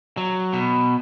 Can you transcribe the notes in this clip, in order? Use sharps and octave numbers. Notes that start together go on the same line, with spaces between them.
F#3
B2